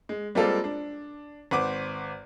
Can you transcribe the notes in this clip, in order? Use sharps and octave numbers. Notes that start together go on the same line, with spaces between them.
G#3
G3 G#3 A#3 C4 F4 A4
D4
G#1 B4 C5 F#5 D6